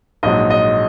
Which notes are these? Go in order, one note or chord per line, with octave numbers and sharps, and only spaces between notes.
A#1 G#2 F#3 D#5
D#5